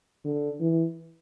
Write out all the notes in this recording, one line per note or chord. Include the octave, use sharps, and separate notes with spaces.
D3
E3